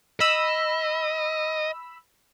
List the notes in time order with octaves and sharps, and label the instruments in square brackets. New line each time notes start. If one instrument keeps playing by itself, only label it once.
[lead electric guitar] D#5 [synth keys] B5 E6